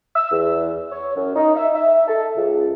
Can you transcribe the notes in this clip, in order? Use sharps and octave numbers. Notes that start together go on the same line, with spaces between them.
E6
E2
C#5
F#2
D#4
E5
E5
A4
C#2